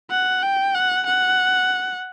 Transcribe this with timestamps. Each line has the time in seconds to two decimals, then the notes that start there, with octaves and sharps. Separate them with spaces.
0.11 F#5
0.43 G5
0.74 F#5
1.07 F#5